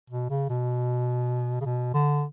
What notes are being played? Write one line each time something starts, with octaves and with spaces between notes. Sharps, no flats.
B2
C#3
B2
C#3
B2
D3